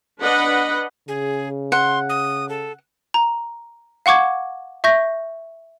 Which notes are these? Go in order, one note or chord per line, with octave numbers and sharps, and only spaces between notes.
D4 B4 D#5 F#5 B5
C#3 G#4
F#5 C6
D#6
A4
A#5
F5 F#5 C#6 D6 G#6
E5 C#6 G6 A#6